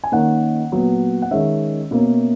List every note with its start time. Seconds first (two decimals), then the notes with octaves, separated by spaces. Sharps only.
0.04 G#5
0.12 D#3 A#3 C#4 F#5
0.72 A#2 F#3 B3
1.22 F#5
1.31 D#3 G#3 C#4 E5
1.91 B2 A#3 C#4